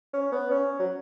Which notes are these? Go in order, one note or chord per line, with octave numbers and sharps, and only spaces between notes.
C#4
B3
C#4
F#3